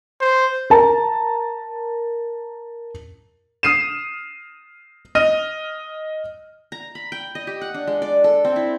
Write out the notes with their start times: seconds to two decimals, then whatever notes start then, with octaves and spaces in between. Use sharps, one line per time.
0.21 C5
0.70 A#4 A5 A#5
3.63 D#6 F6 C7 D#7 E7
5.15 D#5 F6 D#7
6.72 A#5
6.95 B5
7.12 G5
7.35 D#5
7.47 G4
7.61 F#5
7.74 D4
7.87 G#3
8.02 D5
8.24 A4
8.45 C4
8.56 E4